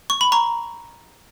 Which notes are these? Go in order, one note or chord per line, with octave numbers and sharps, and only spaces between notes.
C#6
B5
A#5 C#6